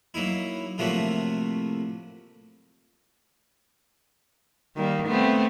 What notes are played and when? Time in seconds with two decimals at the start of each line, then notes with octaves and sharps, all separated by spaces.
0.14 F#3 A#3 D#4 E4
0.78 A2 C3 F3 A3 A#3 F#4
4.76 D#3 G3 A#3
5.06 A3 B3 C4